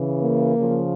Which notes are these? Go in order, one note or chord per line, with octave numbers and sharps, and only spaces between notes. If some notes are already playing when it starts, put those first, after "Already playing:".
Already playing: C#3 E3
A#3
C#3 F3